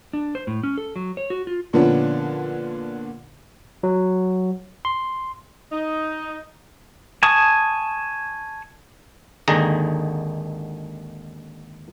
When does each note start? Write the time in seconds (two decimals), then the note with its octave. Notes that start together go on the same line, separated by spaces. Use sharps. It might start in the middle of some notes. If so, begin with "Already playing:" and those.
0.13 D4
0.35 C5
0.47 A2
0.63 C#4
0.78 A4
0.96 F#3
1.17 C#5
1.30 F#4
1.47 F4
1.73 A#2 D3 F3 B3 C#4 D4
3.83 F#3
4.85 C6
5.72 D#4
7.23 G#5 A5 C#6 D#6
9.48 G#1 D#2 D3 D#3 G#4 A#5